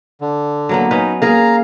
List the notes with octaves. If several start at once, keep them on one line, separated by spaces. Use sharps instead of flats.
D3
F#3 A#3 B3
C#4 D#4 B4
A#3 G#4 A#4 F5 A#5